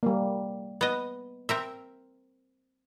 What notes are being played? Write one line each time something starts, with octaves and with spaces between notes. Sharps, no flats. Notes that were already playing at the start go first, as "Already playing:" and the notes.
G3 A#3
B3 D#5
C4 A#4 E5